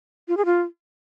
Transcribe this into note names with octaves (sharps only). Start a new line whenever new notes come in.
F4
G#4
F4